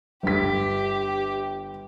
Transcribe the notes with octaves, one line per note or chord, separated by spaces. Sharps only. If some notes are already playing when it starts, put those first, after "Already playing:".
G1 G4 B6